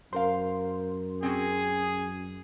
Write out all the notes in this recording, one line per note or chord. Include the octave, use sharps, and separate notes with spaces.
F#2 A#4 C5 F5 C6
C4 C#4 F#4 G#4